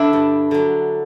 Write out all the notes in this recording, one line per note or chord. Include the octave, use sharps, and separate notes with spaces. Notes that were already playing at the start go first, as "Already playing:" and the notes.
Already playing: D3 D4 E4
G2
D3 F#3